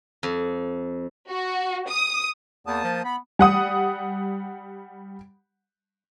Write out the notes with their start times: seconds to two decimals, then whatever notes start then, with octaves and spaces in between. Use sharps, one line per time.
0.23 F2
1.29 F#4
1.88 D#6
2.67 E2 A#3 A5 D#6
2.84 F3
3.04 B3 B5
3.39 G3 F#5 D#6